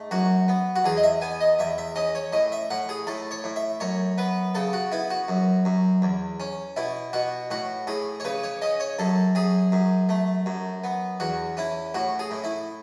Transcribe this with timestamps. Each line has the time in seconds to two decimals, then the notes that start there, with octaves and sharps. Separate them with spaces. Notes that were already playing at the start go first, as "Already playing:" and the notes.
Already playing: G#2 A3
0.11 F#2 F#4
0.48 B3
0.76 F#4
0.84 E2 G#4
0.97 D#5
1.03 E5
1.21 B3 G#5
1.41 D#5
1.59 E2 E5
1.78 E5
1.96 C#4 D#5
2.15 C#5
2.32 A2 D#5
2.52 E5
2.70 A2 F#5
2.89 G#4
3.07 A2 A4
3.31 C#5
3.44 A2
3.56 E5
3.80 F#2 C#5
4.18 B3 B4
4.55 C#3 A4
4.73 F#4
4.92 B3 E4
5.10 F#4
5.28 F#2
5.65 F#2
6.02 E2
6.40 C#4
6.76 B2 E4
7.13 B2 F#4
7.51 A2 F#4
7.87 A2 G#4
8.20 C#5
8.24 C#3 B4
8.43 C#5
8.62 C#4 D#5
8.80 C#5
8.99 F#2 A4
9.35 F#2 G#4
9.72 F#2
10.09 A3
10.46 F#2
10.84 B3
11.20 E2 F#4
11.57 C#4 E4
11.94 A2 F#4
12.19 G#4
12.31 A2
12.44 E4